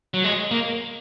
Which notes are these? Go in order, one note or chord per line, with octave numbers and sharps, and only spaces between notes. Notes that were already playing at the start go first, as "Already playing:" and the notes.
F#3
G#3
A#3